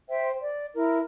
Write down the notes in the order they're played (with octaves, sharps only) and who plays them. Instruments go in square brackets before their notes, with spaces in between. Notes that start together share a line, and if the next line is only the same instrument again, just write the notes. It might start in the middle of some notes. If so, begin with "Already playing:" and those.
[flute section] C5 E5 G5
D5
E4 A#4